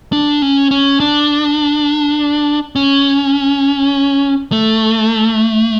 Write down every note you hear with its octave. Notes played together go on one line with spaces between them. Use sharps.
D4
C#4
C#4
D4
C#4
A3